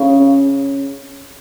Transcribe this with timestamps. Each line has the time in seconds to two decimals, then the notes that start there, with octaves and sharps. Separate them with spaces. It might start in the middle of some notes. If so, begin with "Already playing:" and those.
Already playing: C#3